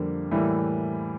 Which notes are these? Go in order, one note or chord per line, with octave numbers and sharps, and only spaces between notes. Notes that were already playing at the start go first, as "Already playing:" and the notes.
Already playing: F2 D3 G3 A#3
A2 E3 G3 A#3